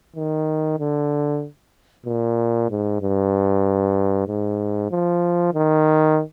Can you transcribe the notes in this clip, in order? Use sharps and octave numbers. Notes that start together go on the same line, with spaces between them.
D#3
D3
A#2
G#2
G2
G#2
F3
D#3